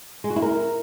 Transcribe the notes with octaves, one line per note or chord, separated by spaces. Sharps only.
G#3
F#4
E4
A#4